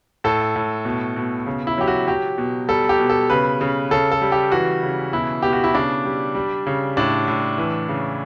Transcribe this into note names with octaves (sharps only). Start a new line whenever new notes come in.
A2 A4
A2
B2
B2
C#3
E4
F#3 G4
F#4
F#3 G4
B2
G3 A4
G4
B2
A4
C#3 B4
C#3
C#3 A4
A4
G3
G4
E3 F#4
C#3
B2 E4
B2 G4
F#4
E4
C#3 D4
G3
G3
C#3
A2 D4
A2
E3
C#3